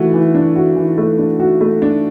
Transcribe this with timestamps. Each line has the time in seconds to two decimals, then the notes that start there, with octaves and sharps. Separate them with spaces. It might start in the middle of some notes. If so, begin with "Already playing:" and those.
Already playing: E3 A3 F#4
0.14 E3
0.34 D4
0.56 F#4
0.76 E3
0.98 A3
1.18 D4
1.40 F#4
1.61 A3
1.82 D4